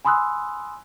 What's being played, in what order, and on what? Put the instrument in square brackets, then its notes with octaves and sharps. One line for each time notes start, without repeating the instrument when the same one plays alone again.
[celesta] G#5 B5 C6 D#6 E6 F#6